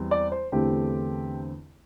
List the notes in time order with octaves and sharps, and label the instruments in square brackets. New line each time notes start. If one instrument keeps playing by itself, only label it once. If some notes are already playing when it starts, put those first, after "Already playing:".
Already playing: [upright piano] E2 E3 G3 C4
D5
C5
E2 D3 A3 C4 G4